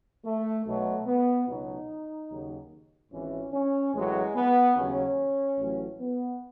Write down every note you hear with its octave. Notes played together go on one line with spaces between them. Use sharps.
A3
B1 B2 F#3 A3
B3
C#2 B2 F#3 D#4
D#2 C#3 F#3
G#1 G#2 E3 C#4
C#4
A1 A2 F#3 G#3
B3
D#2 C#3 F#3 C#4
A1 A2 F#3
B3